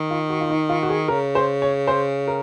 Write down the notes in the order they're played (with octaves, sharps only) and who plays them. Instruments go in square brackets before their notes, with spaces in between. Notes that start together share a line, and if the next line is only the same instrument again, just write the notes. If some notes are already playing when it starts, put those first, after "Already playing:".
Already playing: [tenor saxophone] D#3
[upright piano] F4
F#4
F4
D#4
F4
F#4
G#4
[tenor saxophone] C#3 [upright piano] A#4
[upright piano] C5
C#5
C5
A#4